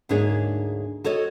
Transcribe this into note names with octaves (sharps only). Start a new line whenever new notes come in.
D2 G#2 A#3 D4 G#4 C#5
F#4 A4 C#5 D#5